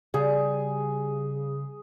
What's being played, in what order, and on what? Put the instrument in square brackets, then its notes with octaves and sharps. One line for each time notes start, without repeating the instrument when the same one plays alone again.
[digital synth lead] C#3 [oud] G3 [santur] G#4